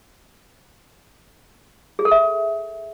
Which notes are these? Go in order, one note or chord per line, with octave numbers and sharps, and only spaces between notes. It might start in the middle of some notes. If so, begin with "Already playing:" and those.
G#4
A4
E5